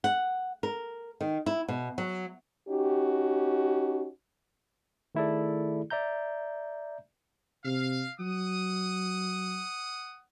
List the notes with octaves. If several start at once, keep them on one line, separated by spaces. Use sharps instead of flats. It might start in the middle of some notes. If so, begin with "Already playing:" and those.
F#5
A#4
D#3
E4
B2
F#3
C#4 D#4 F#4 G4
D#3 A3 E4 G#4 A4 D5
D5 E5 A#5 G6
C3 F5
F#3 F#5 D#6